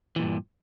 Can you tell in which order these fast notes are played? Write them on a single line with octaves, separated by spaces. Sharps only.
E3 A#2 G2